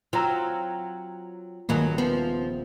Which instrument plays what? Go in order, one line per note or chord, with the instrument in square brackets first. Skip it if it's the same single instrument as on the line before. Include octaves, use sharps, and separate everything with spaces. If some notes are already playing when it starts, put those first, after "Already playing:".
[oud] F#3 C4 [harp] F4 A#5 E6
[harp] D#1 [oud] G2 F#3 G#3 [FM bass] A#3
[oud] F3 [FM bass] B3